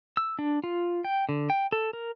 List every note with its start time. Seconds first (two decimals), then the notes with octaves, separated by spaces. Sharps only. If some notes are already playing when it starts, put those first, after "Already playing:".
0.17 E6
0.39 D4
0.64 F4
1.04 G5
1.29 D3
1.50 G5
1.72 A4
1.93 A#4